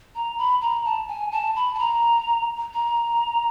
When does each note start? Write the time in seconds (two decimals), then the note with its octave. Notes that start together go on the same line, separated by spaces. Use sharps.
0.15 A#5
0.38 B5
0.61 A#5
0.85 A5
1.08 G#5
1.32 A5
1.56 B5
1.75 A5
1.79 A#5
2.73 A#5